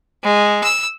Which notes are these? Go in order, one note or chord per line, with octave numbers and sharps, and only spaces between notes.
G#3
E6